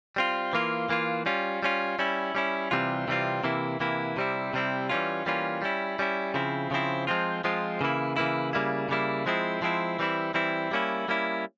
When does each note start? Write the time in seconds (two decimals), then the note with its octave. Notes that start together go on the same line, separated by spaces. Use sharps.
0.16 G3 C4 F4
0.53 E3 A#3 F4
0.89 E3 A#3 F4
1.26 G3 C#4 F4
1.63 G3 C#4 F4
1.99 G3 C#4 E4
2.35 G3 C#4 E4
2.71 C3 E3 G3 C4 F4
3.08 C3 E3 G3 C4 F4
3.44 C3 E3 A#3 E4
3.80 C3 E3 A#3 E4
4.17 C3 G3 C4 E4
4.53 C3 G3 C4 E4
4.89 E3 G3 A#3 C#4 F4
5.26 E3 G3 A#3 C#4 F4
5.62 G3 C#4 E4
5.99 G3 C#4 E4
6.34 C#3 F3 C4 E4
6.71 C#3 F3 C4 E4
7.07 F3 G#3 C4 F4
7.44 F3 G#3 C4 F4
7.81 C#3 E3 A#3 E4
8.17 C#3 E3 A#3 E4
8.53 C#3 G3 A#3 E4
8.89 C#3 G3 A#3 E4
9.26 F3 G#3 C4 E4
9.62 F3 G#3 C4 E4
9.99 E3 G3 C4 E4
10.34 E3 G3 C4 E4
10.71 G3 A#3 C#4 E4
11.08 G3 A#3 C#4 E4